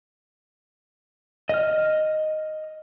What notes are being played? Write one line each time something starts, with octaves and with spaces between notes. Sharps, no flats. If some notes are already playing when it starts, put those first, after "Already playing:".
D#5 F6